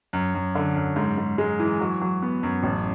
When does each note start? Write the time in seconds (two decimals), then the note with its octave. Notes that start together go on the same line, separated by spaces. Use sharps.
0.13 F#2
0.35 F#2
0.55 D3
0.76 F#2
0.96 G#2
1.17 G#2
1.38 G#3
1.59 E3
1.81 F#3
2.01 F#3
2.22 B3
2.43 F#2
2.63 A1